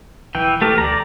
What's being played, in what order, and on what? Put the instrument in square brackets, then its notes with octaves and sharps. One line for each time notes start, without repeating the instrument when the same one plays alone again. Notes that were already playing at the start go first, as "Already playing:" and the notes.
[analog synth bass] B1 [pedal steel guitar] E3 G5
[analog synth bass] E1
[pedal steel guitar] A3 G4 A#4
[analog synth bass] D2 [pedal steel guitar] D5 A#5